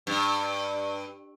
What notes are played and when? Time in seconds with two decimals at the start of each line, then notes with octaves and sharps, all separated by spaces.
0.07 G2